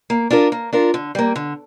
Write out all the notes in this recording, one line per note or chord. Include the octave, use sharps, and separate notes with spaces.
A#3
D4 F4 A#4
A#3
D4 F4 A#4
D3
G3 A#3
D3